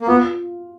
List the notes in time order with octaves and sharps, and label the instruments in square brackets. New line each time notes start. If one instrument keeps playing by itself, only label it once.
[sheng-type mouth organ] A#3
[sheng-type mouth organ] B3 [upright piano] F4